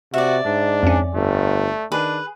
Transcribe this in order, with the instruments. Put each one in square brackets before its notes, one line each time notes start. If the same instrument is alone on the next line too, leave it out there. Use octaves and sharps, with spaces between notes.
[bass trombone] C3 [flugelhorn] F#4 [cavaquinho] D5 E5
[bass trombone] G#2 [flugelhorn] D4
[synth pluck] F2 C#4
[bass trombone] G1 [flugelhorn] A3
[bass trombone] D#3 [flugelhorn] D4 [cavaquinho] G#4 B4